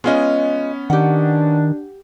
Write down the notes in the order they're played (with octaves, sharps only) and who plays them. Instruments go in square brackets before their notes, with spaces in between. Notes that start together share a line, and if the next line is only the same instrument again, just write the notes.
[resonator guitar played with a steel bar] G#3 F4 D#5 [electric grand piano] B3 C#4
[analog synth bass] D#3 [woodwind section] D4 [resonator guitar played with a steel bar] G4 F#5